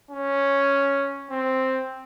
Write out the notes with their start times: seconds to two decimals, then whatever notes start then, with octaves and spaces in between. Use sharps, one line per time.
0.11 C#4
1.31 C4